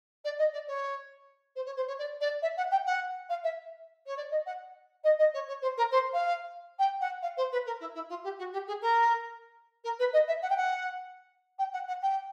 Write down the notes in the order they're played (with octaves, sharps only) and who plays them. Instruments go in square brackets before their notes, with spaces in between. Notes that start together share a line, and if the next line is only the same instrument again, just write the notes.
[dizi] D5
D#5
D5
C#5
C5
C#5
C5
C#5
D5
D5
E5
F#5
G5
F#5
F5
E5
C#5
D5
D#5
F#5
D#5
D#5
C#5
C#5
C5
A#4
C5
F5
G5
F#5
F5
C5
B4
A#4
E4
E4
F4
G4
F#4
G4
G#4
A#4
A#4
B4
D#5
E5
F#5
G5
F#5
G5
F#5
F#5
G5